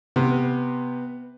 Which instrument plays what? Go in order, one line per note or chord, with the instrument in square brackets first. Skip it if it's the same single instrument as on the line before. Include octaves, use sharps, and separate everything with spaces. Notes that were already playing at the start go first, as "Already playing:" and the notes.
[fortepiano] C3 [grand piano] B3